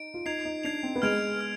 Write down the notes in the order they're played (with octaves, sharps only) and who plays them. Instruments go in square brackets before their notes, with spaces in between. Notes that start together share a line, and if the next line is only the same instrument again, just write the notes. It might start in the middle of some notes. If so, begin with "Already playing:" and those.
Already playing: [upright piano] D#4 [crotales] D7
[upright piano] F4
[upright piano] D#4 [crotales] G#6 C7 F7
[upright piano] D#4
[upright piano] D4 [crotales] G#6 C7 F7
[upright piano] C4
B3
[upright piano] G#3 [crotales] F6 G#6 D7 F7
[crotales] F6